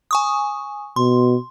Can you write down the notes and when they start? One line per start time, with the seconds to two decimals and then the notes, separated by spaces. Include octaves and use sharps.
0.11 G#5 C#6 D#6
0.96 B2 C6